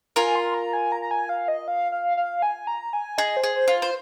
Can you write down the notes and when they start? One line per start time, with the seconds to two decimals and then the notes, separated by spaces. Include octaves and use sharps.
0.16 F4 A#4 G#5
0.36 C6
0.54 A#5
0.73 G#5
0.92 A#5
1.02 A#5
1.11 G#5
1.29 F5
1.48 D#5
1.68 F5
1.92 F5
2.17 F5
2.42 G#5
2.67 A#5
2.93 G#5
3.18 G#4 D#5
3.37 C5
3.43 G#4
3.56 C5
3.68 F4
3.82 C5